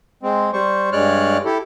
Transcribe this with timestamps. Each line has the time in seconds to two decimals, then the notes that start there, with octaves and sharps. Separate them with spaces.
0.23 G#3 C4
0.53 G3 C5 C#6
0.92 G2 G#3 C#5 D5 F6 F#6
1.45 E4 G4 A4